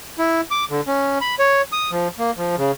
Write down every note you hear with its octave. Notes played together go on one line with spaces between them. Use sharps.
E4
D6
D3
C#4
B5
C#5
D#6
F3
A#3
F3
C#3